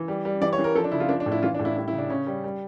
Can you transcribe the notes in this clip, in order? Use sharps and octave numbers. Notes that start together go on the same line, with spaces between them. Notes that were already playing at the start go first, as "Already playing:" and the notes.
Already playing: E3
G3
G3
E3 D5
C#5
E3
A#4
F3 A4
D4
C#3 E4
F4
F3 D4
D4
A2
E4
E3 F4
D4
A2
E4
G3 E4
E4
C#3
D4
C#3 C#4
G3
G3